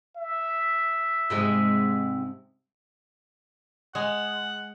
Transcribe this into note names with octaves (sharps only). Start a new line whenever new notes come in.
E5
G#2 C3 G#3
G#3 F#5